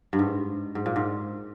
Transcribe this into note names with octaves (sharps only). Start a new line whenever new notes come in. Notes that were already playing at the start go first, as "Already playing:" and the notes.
G2
G#2
G#2
A#2
G#2